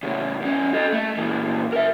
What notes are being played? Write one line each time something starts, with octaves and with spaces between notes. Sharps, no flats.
A2 C#3
E2 C#4
A4 D#5
A3
A#2 E3
A#4 E5